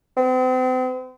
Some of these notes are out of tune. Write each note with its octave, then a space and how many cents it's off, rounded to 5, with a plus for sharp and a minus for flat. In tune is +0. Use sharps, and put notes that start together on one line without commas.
C4 -40